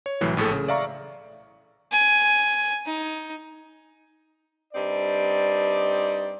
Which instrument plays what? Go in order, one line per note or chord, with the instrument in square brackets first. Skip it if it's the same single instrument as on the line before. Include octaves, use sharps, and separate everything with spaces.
[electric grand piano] C#5
C2 A2 E3 F#3
A#1 A2 G#4 A4
C#3
D5 E5 F5 A#5 C#6
[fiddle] G#5
D#4
[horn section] G2 C4 D#4 D5